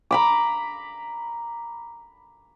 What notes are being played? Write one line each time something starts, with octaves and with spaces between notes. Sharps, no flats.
A#5 B5 D6